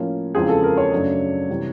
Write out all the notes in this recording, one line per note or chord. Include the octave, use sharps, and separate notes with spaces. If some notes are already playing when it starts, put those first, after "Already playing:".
Already playing: A2 F3 A#3 C#4
E2 C#3 F3 G#3 C4 G#4
A4
A#4
C#5
F#2 C#3 F#3 A3 D4
C3 E3 G3